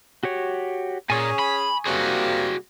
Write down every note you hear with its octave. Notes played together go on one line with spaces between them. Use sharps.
F#4 G4 C#5
A#2 C#4 G#4 G#5 C#6 D#6
B5
C3 G3 A#3 F#4 G#4